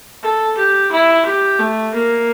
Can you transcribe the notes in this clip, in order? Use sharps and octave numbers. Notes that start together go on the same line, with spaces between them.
A4
G4
E4
G4
A3
A#3